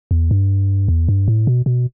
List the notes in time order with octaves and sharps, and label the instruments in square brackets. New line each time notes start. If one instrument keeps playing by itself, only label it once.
[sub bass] E2
G2
E2
G2
A2
B2
B2